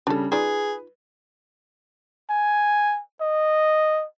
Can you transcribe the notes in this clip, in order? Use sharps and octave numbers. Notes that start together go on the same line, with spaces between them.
C#3 G3 D4 A4
D#4 F4 G#4 B4 D5
G#5
D#5